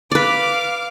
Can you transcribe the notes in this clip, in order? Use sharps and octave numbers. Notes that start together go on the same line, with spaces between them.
B4 D5 F5 D6